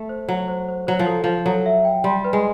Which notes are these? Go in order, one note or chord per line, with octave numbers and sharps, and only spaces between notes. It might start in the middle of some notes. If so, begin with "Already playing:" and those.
Already playing: A3
C5
F#3 C5
C5
C5
F#3 C5
F3
A4
F3 C5
F#3 A4
E5
G5
G3 C6
B4
G#3